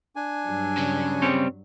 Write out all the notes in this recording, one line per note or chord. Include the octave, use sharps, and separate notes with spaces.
D4 G#5
G2 F#3
C#3
G3 C4 C#5